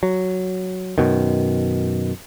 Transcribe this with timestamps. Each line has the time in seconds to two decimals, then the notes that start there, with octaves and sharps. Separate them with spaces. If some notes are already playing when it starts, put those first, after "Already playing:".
0.03 F#3
0.98 F#2 B2 D#3